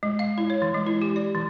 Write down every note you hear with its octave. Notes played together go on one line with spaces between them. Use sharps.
G#3
F5
E4
C#5
E3
G#3
E4
G4
D5
E3